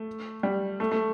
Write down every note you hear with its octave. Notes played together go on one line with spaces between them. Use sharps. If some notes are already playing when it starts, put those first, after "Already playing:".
Already playing: A3
G3
A3
A3